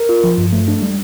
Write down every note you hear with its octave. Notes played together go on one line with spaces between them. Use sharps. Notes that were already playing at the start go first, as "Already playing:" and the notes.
Already playing: A#4
F4
F3
G2
A3
D4
G3